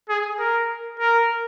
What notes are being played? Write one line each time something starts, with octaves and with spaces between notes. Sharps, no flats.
G#4
A#4
A#4